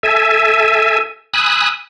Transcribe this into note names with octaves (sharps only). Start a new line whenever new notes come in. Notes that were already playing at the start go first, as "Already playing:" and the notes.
A4 E5 G#5
G#5 B5 D#6 E6 F#6